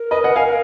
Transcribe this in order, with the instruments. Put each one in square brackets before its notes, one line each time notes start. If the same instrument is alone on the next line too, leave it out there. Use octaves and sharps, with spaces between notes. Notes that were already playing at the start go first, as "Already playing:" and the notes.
Already playing: [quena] A#4
[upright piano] B4 D#5
D#5 F#5
F5 G#5